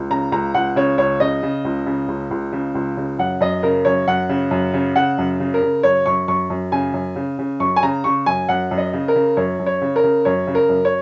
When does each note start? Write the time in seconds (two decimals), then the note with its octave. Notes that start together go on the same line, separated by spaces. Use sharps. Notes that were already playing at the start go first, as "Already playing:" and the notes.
Already playing: C#2
0.10 C#3 A#5
0.32 C#2 A#5
0.54 C#2 F#5
0.76 C#3 C#5
0.98 C#2 C#5
1.20 C#3 D#5
1.43 C#3
1.65 C#2
1.86 C#3
2.08 C#2
2.31 C#2
2.53 C#3
2.75 C#2
2.97 C#3
3.19 F#2 F#5
3.41 F#2 D#5
3.63 C#3 A#4
3.85 F#2 C#5
4.08 F#2 F#5
4.29 C#3
4.51 F#2
4.74 C#3
4.96 C#3 F#5
5.18 F#2
5.40 C#3
5.54 A#4
5.62 C#3
5.83 F#2 C#5
6.06 F#2 C#6
6.28 F#2 C#6
6.50 F#2
6.72 C#3 G#5
6.94 F#2
7.16 C#3
7.39 C#3
7.60 F#2 C#6
7.76 G#5
7.83 C#3 A#5
8.04 C#3 C#6
8.26 F#2 G#5
8.49 F#2 F#5
8.71 F#2
8.78 D#5
8.94 C#3
9.08 A#4
9.15 C#3
9.37 F#2 C#5
9.59 F#2
9.66 C#5
9.82 C#3
9.96 A#4
10.04 C#3
10.25 F#2 C#5
10.47 C#3
10.55 A#4
10.69 F#2
10.85 C#5